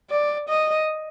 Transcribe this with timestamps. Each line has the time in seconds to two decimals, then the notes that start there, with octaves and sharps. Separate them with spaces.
0.10 D5
0.49 D#5